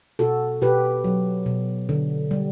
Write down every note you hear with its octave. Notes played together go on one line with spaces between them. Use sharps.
B2 F#4 A4
B2 G4 B4
F#3
B2
D3
G3